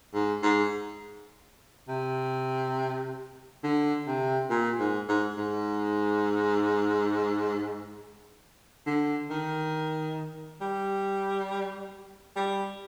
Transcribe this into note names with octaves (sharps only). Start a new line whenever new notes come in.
G#2
G#2
C3
D3
C3
A#2
G#2
G#2
G#2
D3
D#3
G3
G3